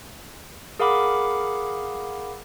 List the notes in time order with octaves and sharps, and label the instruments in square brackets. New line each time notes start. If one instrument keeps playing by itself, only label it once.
[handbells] G#4 A#4 F5 F#5 B5 D6